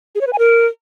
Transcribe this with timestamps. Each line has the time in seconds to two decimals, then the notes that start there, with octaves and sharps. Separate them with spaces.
0.15 G#4
0.21 C#5
0.27 B4
0.33 G#5
0.39 A#4